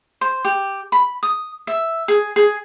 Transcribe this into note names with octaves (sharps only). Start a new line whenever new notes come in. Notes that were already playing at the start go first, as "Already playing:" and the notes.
C5
G4
B5
D#6
E5
G#4
G#4